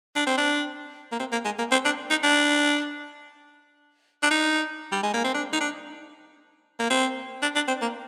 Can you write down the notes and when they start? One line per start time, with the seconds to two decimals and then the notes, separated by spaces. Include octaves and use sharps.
0.16 D4
0.27 C4
0.37 D4
1.12 A#3
1.19 C4
1.32 A#3
1.45 G#3
1.58 A#3
1.71 C4
1.85 D4
2.10 D#4
2.23 D4
4.23 D4
4.30 D#4
4.92 G3
5.03 G#3
5.13 A#3
5.24 C4
5.34 D4
5.53 D#4
5.61 D4
6.79 A#3
6.90 C4
7.42 D4
7.55 D4
7.68 C4
7.81 A#3